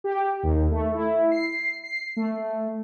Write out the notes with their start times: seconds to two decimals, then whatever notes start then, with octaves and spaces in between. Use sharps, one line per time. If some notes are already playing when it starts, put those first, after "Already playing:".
0.04 G4
0.43 D#2
0.71 A3
0.94 E4
1.31 C7
1.84 C7
2.16 A3